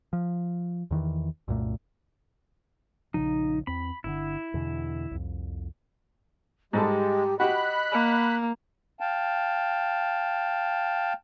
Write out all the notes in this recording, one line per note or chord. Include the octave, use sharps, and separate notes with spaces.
F3
E2 D#3 E3
C2 F#2 A#2 A3
A#1 C#3 F3 D#4
E2 C4 B5
G1 B2 D3 E4
E2 B2 D3
C2 F2
G#2 G3 G#3 G4 A4
F#4 G4 D#5 B5 F#6
A#3
F5 G5 A5